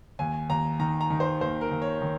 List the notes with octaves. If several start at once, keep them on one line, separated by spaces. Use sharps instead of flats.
D#2 G#5
D#2 A#5
D#3 A#5
A#5
D#3
C5
D#2 C5
A#4
D#2
C#5
D#3